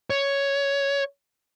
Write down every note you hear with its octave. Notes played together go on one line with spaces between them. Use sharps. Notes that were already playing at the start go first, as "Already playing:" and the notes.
C#5